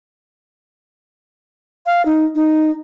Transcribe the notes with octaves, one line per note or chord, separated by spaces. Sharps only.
F5
D#4
D#4